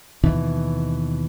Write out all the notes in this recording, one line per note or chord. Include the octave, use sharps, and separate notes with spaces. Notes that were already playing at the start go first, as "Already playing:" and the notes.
D#2 B2 E3